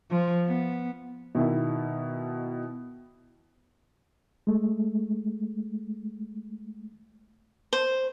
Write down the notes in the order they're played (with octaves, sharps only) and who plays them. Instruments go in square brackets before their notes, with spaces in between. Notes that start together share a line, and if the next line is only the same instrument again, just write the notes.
[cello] F3
B3
[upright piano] B2 D#3 E4
[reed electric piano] G#3 A3
[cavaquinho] C5